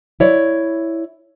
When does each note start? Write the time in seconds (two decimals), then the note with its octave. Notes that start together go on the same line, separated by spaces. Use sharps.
0.20 E4 C#5 D5